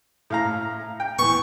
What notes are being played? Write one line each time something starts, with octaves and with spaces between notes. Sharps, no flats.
A2 F5 A#5
G5
E3 B3 C#6